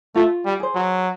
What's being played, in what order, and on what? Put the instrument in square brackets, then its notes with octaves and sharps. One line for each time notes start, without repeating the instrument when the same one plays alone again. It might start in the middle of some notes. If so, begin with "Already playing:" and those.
[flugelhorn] A3 [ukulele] F4
[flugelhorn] G3
[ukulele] G#4 C5
[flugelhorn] F#3